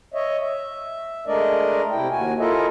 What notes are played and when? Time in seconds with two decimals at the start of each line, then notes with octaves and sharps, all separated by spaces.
0.14 C#5 D#5 E5
0.41 E5
1.27 G#3 A3 D4 A#4 D5 D#5
1.91 C3 E4 G5
2.11 D#2 F#4 G#5
2.39 E4 F4 A4 A#4 D#5 E5